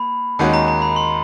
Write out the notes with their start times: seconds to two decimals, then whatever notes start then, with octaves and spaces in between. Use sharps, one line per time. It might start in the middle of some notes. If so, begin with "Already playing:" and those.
Already playing: A#3 B5
0.39 D#2 D#3 G#3 C#4 F#4
0.54 A#5
0.68 A#5
0.82 B5
0.96 C6